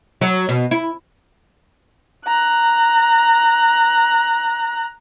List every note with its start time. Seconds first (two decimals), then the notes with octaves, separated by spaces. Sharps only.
0.21 F#3
0.49 B2
0.71 E4
2.27 A#5 F#6